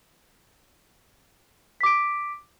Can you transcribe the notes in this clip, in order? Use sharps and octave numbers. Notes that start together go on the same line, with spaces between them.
D6 B6 D7